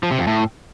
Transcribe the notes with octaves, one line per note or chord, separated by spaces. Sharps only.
F3
C3
F2
A2